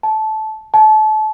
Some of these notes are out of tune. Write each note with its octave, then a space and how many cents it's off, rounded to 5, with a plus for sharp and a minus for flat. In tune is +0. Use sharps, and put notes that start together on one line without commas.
A5 -15
A5 -30